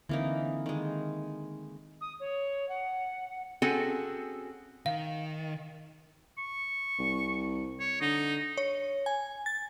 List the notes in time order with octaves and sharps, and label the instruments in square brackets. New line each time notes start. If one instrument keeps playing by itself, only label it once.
[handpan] D3 C4 [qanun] E3 A#3 D#4
[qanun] D#3 G#3
[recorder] D#6
C#5
F#5
[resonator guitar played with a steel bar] C4 C#4 F#4 G#4 A4
[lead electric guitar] D#3 [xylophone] F5
[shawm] C#6
[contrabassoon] C2
[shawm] C#5
[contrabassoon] D3 [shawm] D#4
[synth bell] C#5
G#5
A6